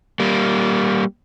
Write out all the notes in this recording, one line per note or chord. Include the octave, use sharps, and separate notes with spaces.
G3 A#3